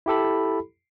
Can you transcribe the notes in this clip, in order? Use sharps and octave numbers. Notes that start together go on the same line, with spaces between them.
E4 G4 A4 B5